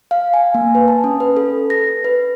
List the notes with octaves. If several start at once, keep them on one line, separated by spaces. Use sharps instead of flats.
F5
G#5
A#3
B4
A5
C#4
B4
A4
A#6
B4